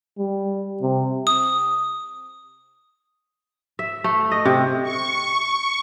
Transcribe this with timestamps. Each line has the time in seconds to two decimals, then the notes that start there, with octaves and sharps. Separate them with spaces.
0.18 G3
0.82 C3
1.27 D#6
3.79 E5
4.04 A3
4.31 D#5
4.45 C3
4.83 C#6